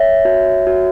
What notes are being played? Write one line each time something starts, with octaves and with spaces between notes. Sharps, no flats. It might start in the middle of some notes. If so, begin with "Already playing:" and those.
Already playing: C#5 E5
F#4
F#4